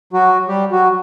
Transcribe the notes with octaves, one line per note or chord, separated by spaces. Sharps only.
F#3 F#4
G3 G4
F#3 F#4